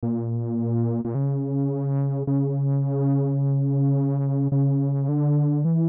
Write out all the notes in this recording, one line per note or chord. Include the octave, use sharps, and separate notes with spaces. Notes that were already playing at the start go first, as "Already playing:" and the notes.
A#2
A#2
C#3
C#3
C#3
D3
E3